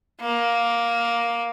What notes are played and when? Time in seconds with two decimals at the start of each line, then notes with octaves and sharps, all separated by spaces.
0.21 A#3